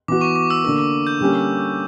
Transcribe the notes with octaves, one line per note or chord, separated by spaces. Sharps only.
E3 B3 F#4 D6
C#6
D6
E6
D3 A#3 D4 A#4 D6
D6
G6
D3 G3 A#3 C#4 G4